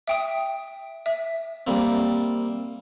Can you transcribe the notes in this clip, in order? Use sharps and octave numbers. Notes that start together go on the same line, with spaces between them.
E5 G5 D#6
E5
G3 A#3 C4